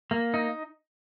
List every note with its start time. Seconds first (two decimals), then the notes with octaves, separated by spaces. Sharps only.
0.11 A#3
0.34 D#4